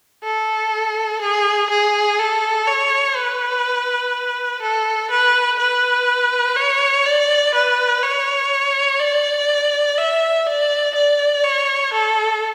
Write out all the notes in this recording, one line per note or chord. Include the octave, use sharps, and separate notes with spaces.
A4
G#4
G#4
A4
C#5
B4
A4
B4
B4
C#5
D5
B4
C#5
D5
E5
D5
D5
C#5
A4